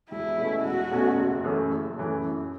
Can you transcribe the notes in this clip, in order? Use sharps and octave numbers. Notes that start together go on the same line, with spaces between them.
E1 E4
E2 B2 A3 C#4
E1 F#4
E2 B2 A3 C#4
F#1
F#2 E3 A3 C#4
F#1
F#2 E3 A3 C#4
F#2